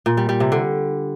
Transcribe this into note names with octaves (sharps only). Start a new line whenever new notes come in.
A#2
G3
G3
C3
D3